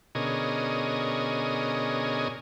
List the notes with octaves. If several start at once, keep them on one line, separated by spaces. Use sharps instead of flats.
B2 D3 C#4 G#4 A#4 D#5